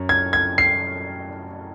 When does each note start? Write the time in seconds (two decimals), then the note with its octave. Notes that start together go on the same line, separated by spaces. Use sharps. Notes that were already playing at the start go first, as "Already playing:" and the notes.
Already playing: F#2 C#4
0.09 G#6
0.33 G#6
0.58 C7